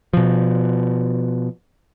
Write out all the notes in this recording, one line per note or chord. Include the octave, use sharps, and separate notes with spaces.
B2 F3